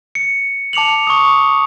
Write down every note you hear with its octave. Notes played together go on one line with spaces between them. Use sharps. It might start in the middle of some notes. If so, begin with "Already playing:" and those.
C#7
A5 D6 C#7 F7 F#7
C#6 D#6